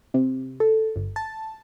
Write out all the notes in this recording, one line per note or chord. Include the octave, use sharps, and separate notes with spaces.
C3
A4
G1
A5